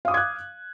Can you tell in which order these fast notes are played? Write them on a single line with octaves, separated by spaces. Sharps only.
F5 D#6 D6 G#6 F#6